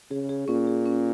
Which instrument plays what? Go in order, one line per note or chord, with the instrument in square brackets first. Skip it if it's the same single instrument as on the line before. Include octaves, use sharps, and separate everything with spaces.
[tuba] C#3 [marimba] G#4
[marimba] G#4
[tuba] A#2 [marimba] C#4
[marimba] G#4
C#4